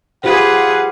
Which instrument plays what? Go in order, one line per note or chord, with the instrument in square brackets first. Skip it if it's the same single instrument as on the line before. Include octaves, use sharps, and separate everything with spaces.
[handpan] F4 G4 C5 [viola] G#4 B4 [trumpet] F#5